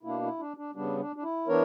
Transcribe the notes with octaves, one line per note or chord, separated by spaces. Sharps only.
B2 A#3 D4 E4
E4
D4
D4
C#3 G3 B3 D4
D4
D4
E4
E3 B3 D4 A#4 C#5